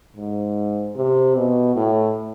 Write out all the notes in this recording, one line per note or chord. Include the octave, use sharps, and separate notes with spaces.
G#2
C3
B2
A2